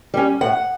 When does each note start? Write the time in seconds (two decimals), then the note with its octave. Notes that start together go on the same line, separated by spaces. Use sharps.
0.14 G3 C#4
0.41 A2 F#5